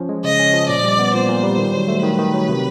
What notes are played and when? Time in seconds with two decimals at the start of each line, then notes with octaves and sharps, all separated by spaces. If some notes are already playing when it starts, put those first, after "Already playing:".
Already playing: F3 C#4
0.09 G#3
0.24 C#3 D#5
0.39 C#4
0.53 F3
0.69 A#2 D5
0.84 G3
0.99 B3
1.14 A#2 C5
1.29 A#2
1.44 G3
1.58 D#3
1.74 F#3
1.88 A3
2.03 D#3 B4
2.18 D#3
2.34 F#3
2.49 C3